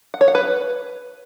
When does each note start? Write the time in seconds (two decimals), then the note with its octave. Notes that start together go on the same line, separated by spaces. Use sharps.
0.14 F#5
0.21 C#5
0.28 F#5
0.35 B4